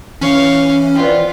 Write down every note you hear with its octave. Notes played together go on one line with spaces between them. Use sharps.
E3 C#4 C#5 F5
B3 C4 F4 D5 G5